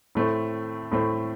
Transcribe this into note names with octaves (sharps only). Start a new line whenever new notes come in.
A2 A3 C4
A2 A3 C4